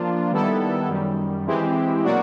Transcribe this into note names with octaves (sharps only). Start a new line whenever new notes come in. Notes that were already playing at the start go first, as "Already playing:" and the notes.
Already playing: F3 A#3 D4 F4
D#3 G3 B3 E4 A4
F#2 D#3 G3
E3 G#3 C4 E4 G4
B2 F#3 A#3 D4 F#4